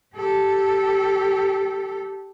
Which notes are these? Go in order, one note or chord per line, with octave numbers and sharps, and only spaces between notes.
G4 A4